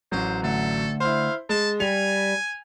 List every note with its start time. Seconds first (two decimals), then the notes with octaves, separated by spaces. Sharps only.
0.12 A1 F#3 C5
0.43 D2 A4
1.00 E4 C5 F5
1.49 G#3 A5
1.80 G3 G#5 F7